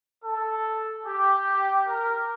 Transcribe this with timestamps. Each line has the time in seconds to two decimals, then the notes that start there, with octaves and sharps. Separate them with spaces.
0.24 A4
1.06 G4
1.88 A#4